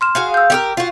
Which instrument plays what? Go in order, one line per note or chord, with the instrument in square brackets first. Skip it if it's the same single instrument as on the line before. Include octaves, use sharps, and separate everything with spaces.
[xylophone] C6 F6 E7
[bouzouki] F#4 G#4 F5
[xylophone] E6 G6
[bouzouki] G4 G#4 A#4
F4 F#4